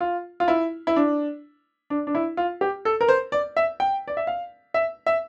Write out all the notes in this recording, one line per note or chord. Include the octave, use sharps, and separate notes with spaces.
F4
F4
E4
E4
D4
D4
D4
E4
F4
G4
A4
A#4
C5
D5
E5
G5
D5
E5
F5
E5
E5